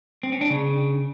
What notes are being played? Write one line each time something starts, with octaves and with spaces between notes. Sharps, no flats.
C4
C#4
D4
C#3